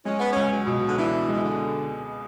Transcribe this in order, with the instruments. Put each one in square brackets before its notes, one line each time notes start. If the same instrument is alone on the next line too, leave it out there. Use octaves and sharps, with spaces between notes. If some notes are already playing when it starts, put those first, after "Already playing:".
[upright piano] G#3 [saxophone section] C#4
[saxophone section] B3
[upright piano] C#2 [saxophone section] C#4
[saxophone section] F#3
[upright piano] B2
[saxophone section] D3
[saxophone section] E3 [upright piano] D4
[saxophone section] E3 [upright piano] G#3
[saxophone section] D3